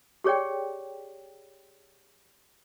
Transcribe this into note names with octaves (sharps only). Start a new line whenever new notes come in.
G4 G#4 C#5 D5 G5